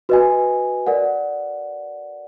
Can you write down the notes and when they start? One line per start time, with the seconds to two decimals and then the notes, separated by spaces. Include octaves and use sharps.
0.09 F#4 B4 D#5 G#5
0.87 A#4 D5 F#5